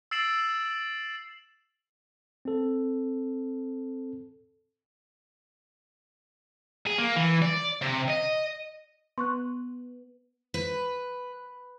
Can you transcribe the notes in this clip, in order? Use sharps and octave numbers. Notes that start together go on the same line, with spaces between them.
E6 A6 C7 D7 E7 F#7
C4 A4
G#4
A#3
E3
D5
C3
D#5
B3 C6 C#6 F#6
B4